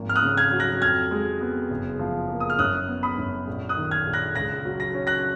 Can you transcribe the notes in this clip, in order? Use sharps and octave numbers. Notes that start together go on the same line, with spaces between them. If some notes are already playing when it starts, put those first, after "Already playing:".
Already playing: G#1 F3 A#3
F6
D#6 F#6
C#3
F6 G#6
F#3
F#6 A#6
F2 F6 G#6
G#3
B3
F#1
F3
A#3
D#6
F6
F#2 D#6 F#6
B3
B5 D#6
F#2
A#1
D#6 F#6
D#3
F6 G#6
A#1
F#6 A#6
C#2 F#6 A#6
F#3
A#6
C#4
F#6 A#6